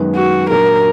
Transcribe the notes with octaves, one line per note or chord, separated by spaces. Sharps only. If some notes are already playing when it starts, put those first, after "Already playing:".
Already playing: F#2 D#3 G#3 B3
F#4
A#2 F#3 D4 A#4